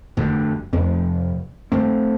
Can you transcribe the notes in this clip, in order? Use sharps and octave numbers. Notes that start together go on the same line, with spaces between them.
F1 D2 G2 D3
F1 F2
G#1 A3 C4